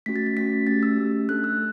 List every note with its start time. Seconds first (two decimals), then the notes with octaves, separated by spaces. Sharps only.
0.06 A3 C#4 F#4 B6
0.16 A6
0.26 A6
0.37 A3 C#4 F#4 B6
0.67 A3 C#4 G4 A6
0.83 E6
0.97 A3 C#4 G4
1.29 A3 D4 A4 F#6
1.44 E6